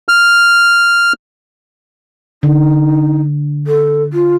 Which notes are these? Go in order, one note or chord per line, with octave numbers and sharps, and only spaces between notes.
F6
D3 D#4
A4
F4